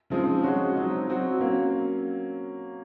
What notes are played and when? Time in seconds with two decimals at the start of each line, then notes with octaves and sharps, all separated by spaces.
0.10 C#3 F3 G#3 C4 D#4
0.43 G#3 C#4 F#4 C#5
0.75 F#3 C4 D#4
1.07 F#3 C4 F#4
1.40 F#3 A#3 C#4